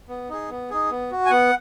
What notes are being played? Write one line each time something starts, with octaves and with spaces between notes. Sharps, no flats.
B3
D#4 G#4
B3
D#4 G#4
B3
F#4
G#5
B3 F#5